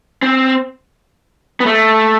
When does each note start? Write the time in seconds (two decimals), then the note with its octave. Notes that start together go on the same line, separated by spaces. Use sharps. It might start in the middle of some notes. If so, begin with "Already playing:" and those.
0.22 C4
1.60 B3
1.66 A3